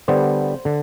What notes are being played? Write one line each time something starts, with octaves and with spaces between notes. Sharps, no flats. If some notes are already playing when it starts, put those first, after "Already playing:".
D3 G3 B3 C5
D3